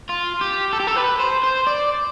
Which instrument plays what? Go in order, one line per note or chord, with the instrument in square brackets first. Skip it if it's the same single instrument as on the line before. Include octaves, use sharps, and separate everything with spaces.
[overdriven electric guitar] F4
G4
A4
G4
A4
B4
C5
C5
D5